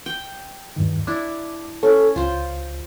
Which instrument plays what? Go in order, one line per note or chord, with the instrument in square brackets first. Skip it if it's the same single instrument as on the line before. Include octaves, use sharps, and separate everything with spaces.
[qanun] G5
[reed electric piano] E2 G2 D#3
[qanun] D4 E4 [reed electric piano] D6
[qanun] C#4 [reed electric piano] A4
[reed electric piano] C#2 [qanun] F4 C5